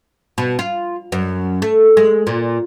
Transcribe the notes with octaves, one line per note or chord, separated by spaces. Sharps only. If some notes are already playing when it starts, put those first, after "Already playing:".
B2
F4
F#2
A3
G#3
A#2